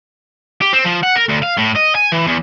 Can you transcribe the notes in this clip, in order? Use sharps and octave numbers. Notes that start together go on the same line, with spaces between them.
G4
C4
F3
F#5
A#4
D2
F5
A2
D#5
G#5
E3
E2